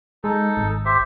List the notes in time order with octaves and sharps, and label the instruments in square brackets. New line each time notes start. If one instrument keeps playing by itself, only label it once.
[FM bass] G#3 [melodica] D#4 A4
[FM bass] G#1
[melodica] G4 C5 E5